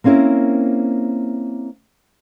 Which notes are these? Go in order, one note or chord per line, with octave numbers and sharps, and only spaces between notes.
A#3 C4 C#4 E4 A#4